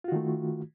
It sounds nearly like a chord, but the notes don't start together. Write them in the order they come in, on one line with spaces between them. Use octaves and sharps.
F4 F#4 D#3 A3